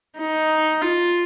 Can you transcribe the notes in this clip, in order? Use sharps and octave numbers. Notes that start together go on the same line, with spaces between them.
D#4
F4